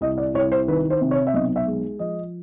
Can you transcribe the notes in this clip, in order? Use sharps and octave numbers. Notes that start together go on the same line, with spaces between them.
C2 D#5
D5
C2 C#5
C5
D#3 B4
C5
C3
C#5
E5
B1 D#5
E5
G#3
F3 D#5